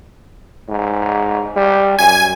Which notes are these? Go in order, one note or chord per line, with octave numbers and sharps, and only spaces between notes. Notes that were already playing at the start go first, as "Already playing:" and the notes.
G#2
G3
F#2 G#5